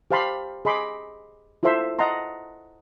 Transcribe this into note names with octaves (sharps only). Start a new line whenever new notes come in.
G4 C5 F5 A5 B5 C6
G#4 D#5 B5 C6 D6
E4 F4 A4 C5 E5 C6
D#5 F#5 A5 A#5 C6